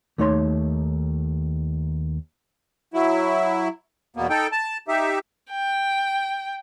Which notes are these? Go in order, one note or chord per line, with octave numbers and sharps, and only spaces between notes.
D#2 A3 D#4 C#5 C6
F#3 E4
E2 B2 A#3 B3
D#4 A4 G5
A5
D#4 G4 E5
G5